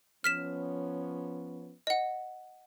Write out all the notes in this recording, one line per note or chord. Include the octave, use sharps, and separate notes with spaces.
F3 B3 C#4 F6 B6 E7
D#5 F#5